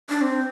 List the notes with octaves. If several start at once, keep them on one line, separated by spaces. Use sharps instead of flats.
D4
C4